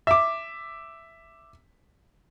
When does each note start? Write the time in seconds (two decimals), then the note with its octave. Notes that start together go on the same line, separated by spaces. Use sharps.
0.07 E5 D6